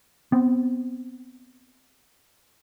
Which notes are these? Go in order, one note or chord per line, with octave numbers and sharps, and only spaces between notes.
B3 C4